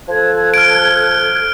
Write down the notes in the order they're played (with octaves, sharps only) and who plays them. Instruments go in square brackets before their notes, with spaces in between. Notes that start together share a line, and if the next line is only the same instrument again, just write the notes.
[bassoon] F3 [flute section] A4 F#6 G#6
[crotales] F6 D7